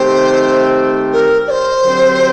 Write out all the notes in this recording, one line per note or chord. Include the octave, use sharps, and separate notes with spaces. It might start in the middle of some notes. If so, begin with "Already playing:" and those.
Already playing: D#3 A3 C4 G4 C5
A#4
D5
C5
D3 F#3 C4 G4